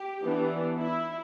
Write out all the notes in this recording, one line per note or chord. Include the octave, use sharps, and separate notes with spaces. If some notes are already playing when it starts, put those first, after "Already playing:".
Already playing: G4
E3 B3 D4
E4